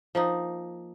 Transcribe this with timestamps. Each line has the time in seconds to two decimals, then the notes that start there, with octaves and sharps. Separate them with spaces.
0.15 F3 A#3 D#4